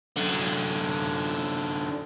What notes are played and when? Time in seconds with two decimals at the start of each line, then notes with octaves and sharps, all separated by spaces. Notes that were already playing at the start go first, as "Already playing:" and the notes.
0.17 F#2 D3